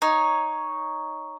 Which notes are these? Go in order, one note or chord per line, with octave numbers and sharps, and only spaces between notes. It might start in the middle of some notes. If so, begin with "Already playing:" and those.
D#4 C#5